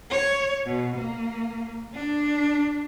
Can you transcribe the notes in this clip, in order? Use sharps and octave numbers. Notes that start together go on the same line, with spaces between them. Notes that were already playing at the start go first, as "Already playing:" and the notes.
C#5
B2
A#3
D4